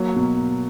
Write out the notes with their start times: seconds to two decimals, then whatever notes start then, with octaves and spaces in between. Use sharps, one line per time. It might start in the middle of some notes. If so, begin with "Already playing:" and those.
Already playing: F#3 A#3
0.16 B2